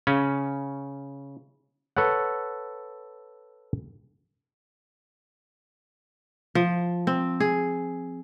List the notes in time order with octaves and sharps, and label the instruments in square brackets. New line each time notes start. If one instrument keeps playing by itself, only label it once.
[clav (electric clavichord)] C#3 C#4
A4 B4 C#5 F#5
[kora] F3
C4
G#4